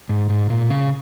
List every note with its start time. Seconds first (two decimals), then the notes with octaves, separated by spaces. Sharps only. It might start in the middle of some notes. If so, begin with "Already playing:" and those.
0.09 G#2
0.30 G#2
0.50 A#2
0.70 C#3